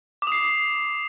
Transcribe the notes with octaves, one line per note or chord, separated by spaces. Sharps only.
D6 D#6 C7